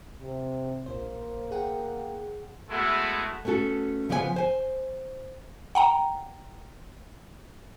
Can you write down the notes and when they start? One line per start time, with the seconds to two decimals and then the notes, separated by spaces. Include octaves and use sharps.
0.21 C3
0.86 A#1 A#3 C5
1.51 G#4 F#5 G5
2.70 G#3 A3 B3 E4 F#4
3.45 A3 B3 C#4 F#4 A4
4.09 C#3 F3 B3 B4 D5 G#5
4.36 C5 G#5
5.75 F#5 G5 A#5